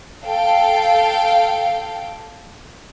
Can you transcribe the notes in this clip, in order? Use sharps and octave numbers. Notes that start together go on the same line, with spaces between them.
A4 F5 G5